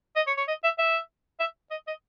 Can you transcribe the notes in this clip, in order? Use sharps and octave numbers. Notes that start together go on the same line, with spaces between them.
D#5
C#5
C#5
D#5
E5
E5
E5
D#5
D#5